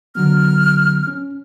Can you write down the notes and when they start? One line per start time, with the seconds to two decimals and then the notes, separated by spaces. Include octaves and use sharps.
0.15 D3 F#3 B3 F6
1.07 C#4